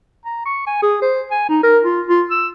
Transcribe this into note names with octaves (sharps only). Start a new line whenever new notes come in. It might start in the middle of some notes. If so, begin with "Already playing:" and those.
A#5
C#6
G#5
G#4
C5
G#5
D#4
A#4
F4
F4
E6